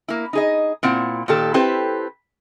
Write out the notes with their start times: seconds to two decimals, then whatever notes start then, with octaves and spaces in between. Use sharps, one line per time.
0.08 A#3 E4
0.33 D#4 G#4 D#5
0.83 A#2 C4 E4 F#5
1.28 A#2 D#3 G4 A4
1.54 C4 E4 G4 A4 B4 C5